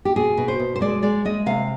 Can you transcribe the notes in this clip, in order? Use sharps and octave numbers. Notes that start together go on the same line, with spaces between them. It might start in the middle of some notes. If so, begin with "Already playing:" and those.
G4
B2 G#4
B2
C5
B2
C5
G#3 D5
G#3 D5
G#3 D#5
C3 F5